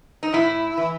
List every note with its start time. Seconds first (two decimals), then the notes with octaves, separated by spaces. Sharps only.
0.23 D#4
0.33 A2 E4
0.77 E3